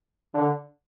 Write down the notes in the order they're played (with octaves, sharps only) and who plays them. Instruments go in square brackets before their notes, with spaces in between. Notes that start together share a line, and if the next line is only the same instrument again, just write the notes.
[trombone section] D3